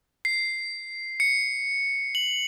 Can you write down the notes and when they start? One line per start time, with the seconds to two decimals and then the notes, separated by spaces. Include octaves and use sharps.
0.25 C7
1.20 C#7
2.15 F#7